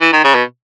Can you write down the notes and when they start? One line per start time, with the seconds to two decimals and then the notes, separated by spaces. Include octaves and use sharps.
0.01 E3
0.13 D#3
0.24 C#3
0.35 B2